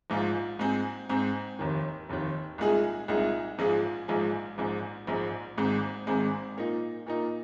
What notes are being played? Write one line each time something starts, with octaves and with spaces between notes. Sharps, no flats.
A#1 G#2 G#3 F4
G#2 G#3 C4
G#2 G#3 C4
F1 D#2 D#3
F1 D#2 D#3
C2 A#2 G#3 D#4 G#4
C2 A#2 G#3 D#4 G#4
A#1 G#2 G#3 F4 G#4
A#1 G#2 G#3 F4 G#4
A#1 G#2 G#3
A#1 G#2 G#3
G#1 G#2 G#3 C4
G#1 G#2 G#3 C4
A#2 A#3 D#4
A#2 A#3 D#4